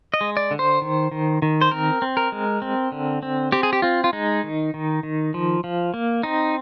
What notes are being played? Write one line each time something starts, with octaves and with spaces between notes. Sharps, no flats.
D#5
G#3
D5
D3
C5
D#3
D#3
D#3
C5
C4 A#4
C4
A#4
G#3
C4
D3
C4
C4 G4
G#4
G4
C4 F4
F4
G#3 D#4
D#3
D#3
D#3
F3
F3
A#3
C4 D#4